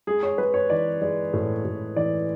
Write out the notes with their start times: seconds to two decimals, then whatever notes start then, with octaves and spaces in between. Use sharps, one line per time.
0.07 G#3 G#4
0.23 C#5
0.38 G#3 B4
0.54 C#5
0.70 E3 D5
1.02 G#3 D5
1.33 A2
1.65 A2
1.96 E3 D5